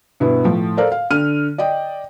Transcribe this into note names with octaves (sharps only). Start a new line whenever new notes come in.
G2 B2 B3 E4
A2 F3
A4 A#4 C5 D5 F5
F5
D3 F6 D#7
D5 D#5 G5